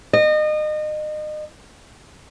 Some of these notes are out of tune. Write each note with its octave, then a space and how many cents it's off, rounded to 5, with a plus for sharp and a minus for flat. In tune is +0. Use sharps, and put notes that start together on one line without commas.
D#5 -30